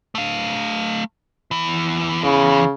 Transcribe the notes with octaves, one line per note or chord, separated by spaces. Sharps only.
A3 F5
E2 E3
C#3